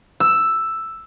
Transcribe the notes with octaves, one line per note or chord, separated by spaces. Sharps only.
E6